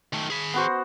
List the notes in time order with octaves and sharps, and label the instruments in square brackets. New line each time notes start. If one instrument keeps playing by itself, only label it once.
[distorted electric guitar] D#3 A3
G#4 B5
[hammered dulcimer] B3 F#4 C5